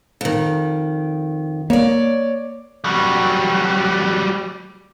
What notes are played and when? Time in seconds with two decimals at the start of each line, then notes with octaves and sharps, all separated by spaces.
0.21 F2 D#3
1.70 A#3 C#5 D5
2.84 F#3 G3